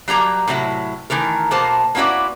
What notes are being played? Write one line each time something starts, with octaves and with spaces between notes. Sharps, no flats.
F#3 G3 A#3 A#5
A2 C3 F#3 E4
D#3 E3 A3 A#4
B2 A#3 C5 A5
A#3 B3 C#4 E4 F#4 D5